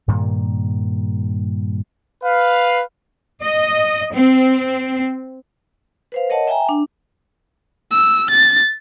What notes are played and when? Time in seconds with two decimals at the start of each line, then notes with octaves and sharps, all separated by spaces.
0.08 G2 A#2 D#3 A#3
2.23 B4 F5
3.41 D#5
4.14 C4
6.12 B4 C5 F5
6.30 A#4 C#5 D#5 F#5 A5
6.47 E5 G5 G#5 A#5
6.69 D4
7.91 E6
8.30 A6